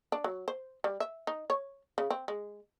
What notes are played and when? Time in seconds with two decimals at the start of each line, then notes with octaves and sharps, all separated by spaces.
0.12 D4
0.24 F#3
0.48 C5
0.84 G3
1.00 E5
1.27 D#4
1.50 C#5
1.98 C#3
2.10 C4
2.28 G#3